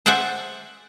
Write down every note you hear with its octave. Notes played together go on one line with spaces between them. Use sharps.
C5 D5 E5 F#5 G#5